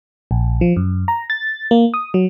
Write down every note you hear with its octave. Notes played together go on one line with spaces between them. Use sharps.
A#1
F3
F#2
A#5
A6
A#3
D#6
F#3